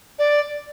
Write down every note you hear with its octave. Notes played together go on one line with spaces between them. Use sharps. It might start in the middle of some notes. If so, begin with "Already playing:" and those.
D5